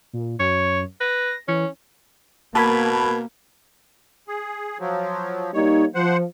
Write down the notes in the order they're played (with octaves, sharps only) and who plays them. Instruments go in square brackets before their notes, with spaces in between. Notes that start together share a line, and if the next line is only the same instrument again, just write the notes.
[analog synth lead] A#2
[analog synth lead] F#2 [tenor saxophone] C#5
[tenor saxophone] B4 [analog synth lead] A#6
[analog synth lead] E3 [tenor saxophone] C#4
[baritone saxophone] B2 [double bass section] A#3 [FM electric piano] A5 B5 G#6
[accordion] G#4
F3 F#3
[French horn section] G3 A#3 D#4 [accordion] C#5
[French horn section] F3 [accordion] C5 F#5